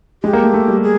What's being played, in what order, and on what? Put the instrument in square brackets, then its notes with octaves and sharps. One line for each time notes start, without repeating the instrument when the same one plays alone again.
[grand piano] G#3 [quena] G4
[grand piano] A#3
A3
A3
G3
[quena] G#4